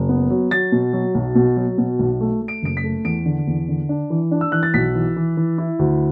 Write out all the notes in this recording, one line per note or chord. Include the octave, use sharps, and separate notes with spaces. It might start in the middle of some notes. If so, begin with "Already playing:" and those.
Already playing: F#1
B3
F#3
F#3 A6
B2
F#3
B1
B2
F#3
B2
B1
A3
A3
D7
F#1 D7
B6
A3
E2 D7
D3
E2
D3
D4
E3
D4
E6
E3 F#6
A6
B1 B6
E3
E3
E3
E4
D2